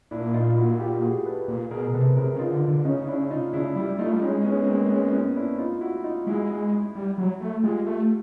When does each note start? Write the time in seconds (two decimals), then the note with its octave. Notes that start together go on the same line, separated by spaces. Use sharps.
0.11 A#2 D4 E4
0.34 D#4 F4
0.57 E4 F#4
0.80 F4 G4
1.03 F#4 G#4
1.25 A4 B4
1.48 A#2
1.71 B2 G#4 A#4
1.87 A#4
1.94 C3 A4 B4
2.16 C3 G#4 A#4
2.34 C#3
2.39 D#4 F4
2.50 D3
2.68 D3
2.84 C#3 C#4 D#4
3.08 D4 E4
3.30 D#4 F4
3.53 C#3 D4 E4
3.76 G3 D4 E4
3.99 A3 D#4 F4
4.12 G3
4.22 G#3 C#4 D#4
4.45 B3 C#4
4.59 C#4
4.67 A#3 C4
4.90 B3 C#4
5.13 B3 C#4
5.36 D4 E4
5.58 D#4 F4
5.81 E4 F#4
6.04 D#4 F4
6.27 G#3 E4 F#4
6.95 G3
7.18 F#3
7.40 A3
7.63 G#3 F4 G4
7.86 A3